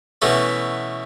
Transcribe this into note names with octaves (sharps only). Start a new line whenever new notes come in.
B2 E3 A3 C#4